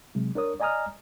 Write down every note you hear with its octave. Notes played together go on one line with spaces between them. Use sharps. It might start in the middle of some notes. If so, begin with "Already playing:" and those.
C3 F#3 G#3
D4 A#4 C#5 D#6
D5 D#5 G#5 A#5 D#6 F6